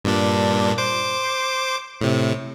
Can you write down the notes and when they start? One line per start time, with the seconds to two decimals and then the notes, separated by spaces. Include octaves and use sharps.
0.05 G2 A#2 D4
0.78 C5 D6
2.01 A2 C3